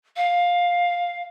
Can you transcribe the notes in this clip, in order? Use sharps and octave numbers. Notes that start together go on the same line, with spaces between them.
F5